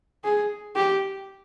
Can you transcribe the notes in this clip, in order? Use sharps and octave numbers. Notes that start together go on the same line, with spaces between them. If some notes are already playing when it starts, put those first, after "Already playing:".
G#4
G4